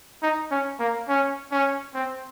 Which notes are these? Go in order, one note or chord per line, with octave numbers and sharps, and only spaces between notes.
D#4
C#4
A#3
C#4
C#4
C4